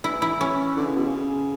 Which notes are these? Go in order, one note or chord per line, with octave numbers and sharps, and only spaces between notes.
E3 E4
E4
C#4
D3
C#3
B2
C#3